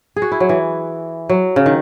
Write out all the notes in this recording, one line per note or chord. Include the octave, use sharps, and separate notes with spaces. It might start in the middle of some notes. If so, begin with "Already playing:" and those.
G#4
F#4
E4
F#3
E3
F#3
C#3
D#3